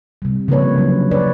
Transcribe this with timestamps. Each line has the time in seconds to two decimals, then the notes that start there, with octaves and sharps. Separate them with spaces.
0.22 C3 G3
0.48 C#3 F3 A#3 D4 B4 C#5
0.78 F#3
1.11 D4 B4 C#5 D5